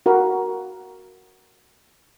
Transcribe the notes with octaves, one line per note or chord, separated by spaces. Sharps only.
F#4 A#4 F5 B5